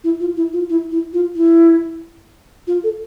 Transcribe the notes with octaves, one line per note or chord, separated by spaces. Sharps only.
E4
F4
E4
F4
E4
E4
F4
E4
F4
A4